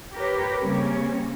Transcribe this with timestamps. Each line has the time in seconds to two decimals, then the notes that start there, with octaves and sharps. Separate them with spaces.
0.13 G4 A#4 B4 C#5
0.63 C#3 G3 A#3 C4 C#4